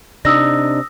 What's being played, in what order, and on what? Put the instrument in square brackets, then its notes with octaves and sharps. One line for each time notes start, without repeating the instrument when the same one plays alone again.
[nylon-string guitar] C3 D4 D#4 [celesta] D#6 E6 A#6